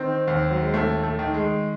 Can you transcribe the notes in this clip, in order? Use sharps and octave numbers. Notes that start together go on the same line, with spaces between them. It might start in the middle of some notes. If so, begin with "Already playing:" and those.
Already playing: D#3 C4
D#2
F#3
G#3
D#2 A3
A3
D#3
G#3